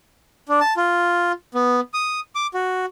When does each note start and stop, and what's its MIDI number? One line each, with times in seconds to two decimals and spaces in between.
0.49 0.60 62
0.60 0.74 81
0.77 1.32 65
1.55 1.80 59
1.94 2.20 87
2.35 2.47 86
2.54 2.86 66